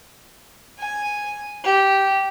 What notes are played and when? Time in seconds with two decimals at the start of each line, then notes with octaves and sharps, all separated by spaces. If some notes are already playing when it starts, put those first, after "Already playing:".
0.79 G#5
1.64 G4